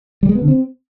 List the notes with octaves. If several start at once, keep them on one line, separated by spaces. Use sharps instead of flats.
G3
G#3
B3
D3
C4